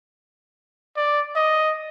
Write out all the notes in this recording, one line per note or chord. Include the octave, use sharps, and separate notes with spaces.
D5
D#5